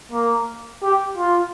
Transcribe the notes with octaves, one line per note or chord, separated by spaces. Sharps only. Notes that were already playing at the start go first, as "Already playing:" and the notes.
A#3
G4
F4